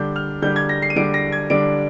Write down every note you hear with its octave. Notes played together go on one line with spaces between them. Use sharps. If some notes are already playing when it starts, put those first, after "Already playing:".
Already playing: D3 G3 D4 G6
F6
D3 G3 D4 G6
G#6
A#6
C7
D#7
D3 G3 D4 D7
A#6
G#6
D3 G3 D4 D7